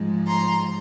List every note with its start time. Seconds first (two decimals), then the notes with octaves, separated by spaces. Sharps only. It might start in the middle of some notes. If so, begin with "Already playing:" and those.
Already playing: G#2 F3 G#3
0.27 A#5 C6